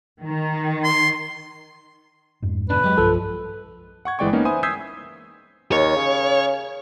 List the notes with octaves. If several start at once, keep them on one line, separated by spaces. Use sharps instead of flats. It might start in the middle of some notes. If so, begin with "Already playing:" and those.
D#3
C6
F2 G#2
B2 D3 D4 B4
F#3 G#3 G4
B1 G2 F3 A4
F#5 C#6 G#6
G1 E3 G#3 D5 G5 C#6
A#3 B3 C#4 D#4
B4 C5 E5 G#5 B5 D#6
D#6 E6 G6 G#6 B6 C7
D#2 C#5
C#3